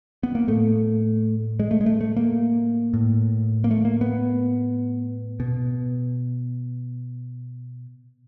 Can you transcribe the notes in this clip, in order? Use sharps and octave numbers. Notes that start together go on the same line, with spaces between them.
B3
A#3
A2 A3
G#3
A3
G#3
A3
A3
A#3
A2
A#3
A3
A#3
B3
B2